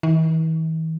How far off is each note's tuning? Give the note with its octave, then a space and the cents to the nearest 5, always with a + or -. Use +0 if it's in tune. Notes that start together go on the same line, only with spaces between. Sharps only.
E3 -45